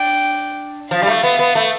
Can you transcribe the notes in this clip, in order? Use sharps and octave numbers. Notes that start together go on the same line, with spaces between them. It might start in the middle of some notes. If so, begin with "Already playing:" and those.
Already playing: D4 G5
F3 F5
G3
A3
B3
B3
A3